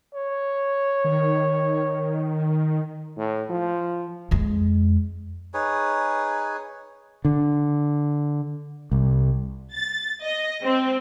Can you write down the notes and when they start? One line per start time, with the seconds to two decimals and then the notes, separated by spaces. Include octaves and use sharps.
0.14 C#5
1.04 D#3
3.17 A2
3.50 F3
4.31 F2 G#3
5.54 D#4 G#4 B4 C#5
7.25 D3
8.92 C2
9.73 A6
10.23 D#5
10.64 C4